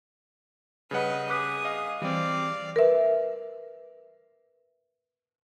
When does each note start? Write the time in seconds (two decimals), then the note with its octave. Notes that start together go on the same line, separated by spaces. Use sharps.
0.91 C#3 G3 B4 D#5 F#5
1.30 G#4 D6 D#6 F#6 B6
1.65 D#5 F5
2.02 E3 G3 C4 D5 F5
2.76 A#4 B4 E5